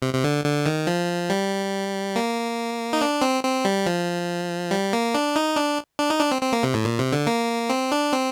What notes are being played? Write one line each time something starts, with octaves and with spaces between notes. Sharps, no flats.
C3
C3
D3
D3
D#3
F3
G3
A#3
D#4
D4
C4
C4
G3
F3
G3
A#3
D4
D#4
D4
D4
D#4
D4
C4
C4
A#3
C3
A2
A#2
C3
D3
A#3
C4
D4
C4